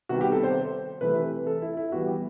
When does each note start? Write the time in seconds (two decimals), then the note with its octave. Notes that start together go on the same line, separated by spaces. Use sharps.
0.09 C3 D#3 G3 B3 F#4
0.21 G4
0.32 A4
0.43 C5
1.01 C3 E3 A3 B4
1.47 A4
1.62 E4
1.77 E4
1.92 E3 G3 B3 F#4
2.07 G4